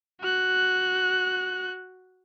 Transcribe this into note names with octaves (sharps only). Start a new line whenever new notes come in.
F#4 F#6